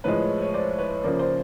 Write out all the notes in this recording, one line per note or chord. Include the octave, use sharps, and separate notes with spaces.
A2 F3 G#3 B4 C#5
C#5
C5 D5
B4 C#5
C#3 F3 A#3 C5 D5
C5 D5